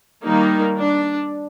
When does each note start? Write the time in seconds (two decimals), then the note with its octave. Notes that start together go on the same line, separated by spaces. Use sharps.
0.24 D#3 G3 A#3 D#4
0.78 D4